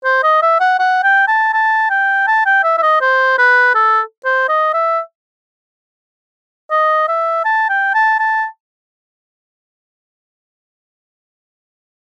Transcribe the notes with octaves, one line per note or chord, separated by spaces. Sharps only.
C5
D#5
E5
F#5
F#5
G5
A5
A5
G5
A5
G5
E5
E5
D#5
C5
B4
A4
C5
D#5
E5
D#5
E5
A5
G5
A5
A5